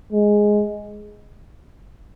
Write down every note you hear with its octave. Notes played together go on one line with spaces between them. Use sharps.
G#3